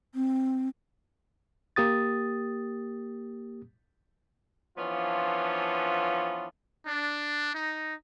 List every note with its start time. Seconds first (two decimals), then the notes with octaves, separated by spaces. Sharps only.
0.15 C4
1.76 A#3 G4 D#6 A6
4.77 E3 F3 B3 C#4 D4 F4
6.86 D4
7.54 D#4